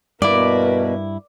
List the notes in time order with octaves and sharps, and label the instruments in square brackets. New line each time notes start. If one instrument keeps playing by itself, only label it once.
[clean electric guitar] G2 E4 [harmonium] B2 [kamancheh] A#3 B4 [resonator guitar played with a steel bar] D5